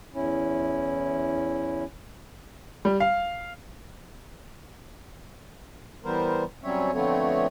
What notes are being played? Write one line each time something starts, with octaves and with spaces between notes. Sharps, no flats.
E2 C#4 E4
G3
F5
E3 G3 B3 A#4 C5
F#3 G3 C4 C#4 C#5 E5
D3 F3 A3 B3 C4 C#5